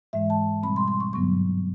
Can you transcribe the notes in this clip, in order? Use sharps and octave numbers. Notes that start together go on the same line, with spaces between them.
G#2 E3 G#3 E5
A5
B2 G3 C4 B5
C6
C6
C#6
G2 D3 F#3 B3 C#6